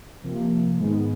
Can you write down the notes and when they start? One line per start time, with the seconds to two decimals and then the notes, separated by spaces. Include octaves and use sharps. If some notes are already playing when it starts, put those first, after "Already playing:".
0.23 C3 F3 A#3
0.78 G#2 D#3 G#3 B3